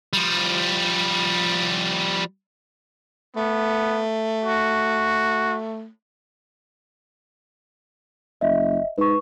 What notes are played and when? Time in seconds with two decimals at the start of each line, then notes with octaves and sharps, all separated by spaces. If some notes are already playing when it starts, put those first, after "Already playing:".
0.13 F3 G3
3.36 A3 B3
4.45 F#4
8.41 F#1 D#5 E5
8.98 G#2 B4 C#6